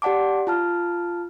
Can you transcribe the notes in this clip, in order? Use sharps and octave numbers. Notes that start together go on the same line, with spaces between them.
G4 D5 F#5 A5 D6
F4 A5 F6